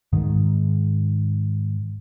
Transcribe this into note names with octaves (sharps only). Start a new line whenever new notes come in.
G#2 D#3